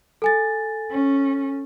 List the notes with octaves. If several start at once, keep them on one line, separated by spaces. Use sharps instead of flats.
A4 G#5 A6
C#4